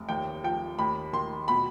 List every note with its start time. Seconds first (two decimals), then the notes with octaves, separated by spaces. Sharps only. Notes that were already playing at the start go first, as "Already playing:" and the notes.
Already playing: F1
0.09 D#2 G5
0.43 F3 G5
0.79 D#2 B5
1.13 D#3 C6
1.48 B2 B5